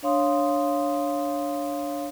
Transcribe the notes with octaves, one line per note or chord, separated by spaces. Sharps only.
D4 C#5 F5 C6 D#6